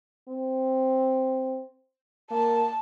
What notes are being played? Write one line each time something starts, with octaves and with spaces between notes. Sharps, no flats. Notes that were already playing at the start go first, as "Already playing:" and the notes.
C4
A#3 A5